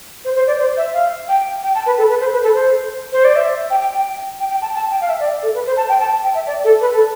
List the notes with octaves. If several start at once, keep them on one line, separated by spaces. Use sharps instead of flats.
C5
C5
D5
C5
E5
F5
G5
G5
A5
B4
A4
B4
C5
B4
A4
C5
C5
D5
E5
G5
G5
G5
G5
G5
A5
A5
G5
F5
E5
D5
A4
B4
C5
A5
G5
A5
G5
E5
D5
A4
B4
A4